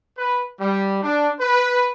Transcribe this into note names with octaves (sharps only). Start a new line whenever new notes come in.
B4
G3
D4
B4